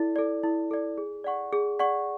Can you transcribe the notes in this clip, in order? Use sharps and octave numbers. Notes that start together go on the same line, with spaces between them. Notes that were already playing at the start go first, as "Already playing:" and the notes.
Already playing: E4 A4 D5
A4 D5
E4
A4 D5
G#4
D5 F#5 C#6
G#4
D5 F#5 C#6